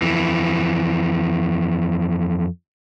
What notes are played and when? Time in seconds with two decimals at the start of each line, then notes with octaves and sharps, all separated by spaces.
0.02 F2 E3